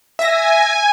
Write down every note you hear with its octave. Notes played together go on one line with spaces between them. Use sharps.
E5 G#5 A#6